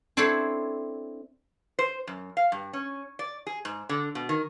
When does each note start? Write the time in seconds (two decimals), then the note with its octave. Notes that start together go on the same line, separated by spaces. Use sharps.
0.17 C4 D4 E4 A4 C5 C#5
1.79 C5
2.07 F#2
2.37 F5
2.52 G2
2.73 C#4
3.19 D5
3.47 G#4
3.65 G#2
3.89 D3
4.15 B2
4.29 D#3